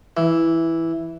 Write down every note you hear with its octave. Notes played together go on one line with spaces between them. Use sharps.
E3